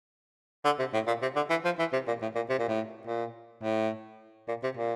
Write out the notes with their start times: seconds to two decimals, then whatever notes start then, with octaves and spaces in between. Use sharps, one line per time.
0.65 D3
0.79 C3
0.94 A2
1.07 A#2
1.22 C3
1.36 D3
1.50 E3
1.64 F3
1.79 E3
1.93 C3
2.07 A#2
2.22 A2
2.35 A#2
2.50 C3
2.59 A#2
2.68 A2
3.07 A#2
3.63 A2
4.48 A#2
4.63 C3
4.77 A#2